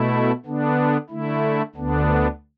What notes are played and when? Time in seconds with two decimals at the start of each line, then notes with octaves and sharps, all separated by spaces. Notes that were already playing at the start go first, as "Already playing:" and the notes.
Already playing: B2 A3 E4
0.45 D3 B3 D4
1.10 D3 A3 E4
1.75 D2 D3 B3 D4